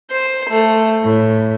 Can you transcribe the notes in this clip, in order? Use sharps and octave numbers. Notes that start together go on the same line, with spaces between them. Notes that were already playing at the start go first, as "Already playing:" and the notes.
C5
A3
A2